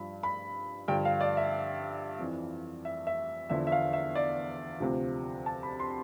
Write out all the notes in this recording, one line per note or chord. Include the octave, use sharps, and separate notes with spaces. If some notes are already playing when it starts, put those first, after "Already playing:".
Already playing: G2 F3 B5
B5
G2 D3 F3 G5
F5
D5
E5
F2 E3
E5
E5
E2 D3 F3 E5
E5
F5
E5
D5
D2 C3 F3
A5
B5
C6